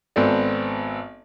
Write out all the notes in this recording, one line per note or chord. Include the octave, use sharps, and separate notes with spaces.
G#1 B3 C4 A4 D5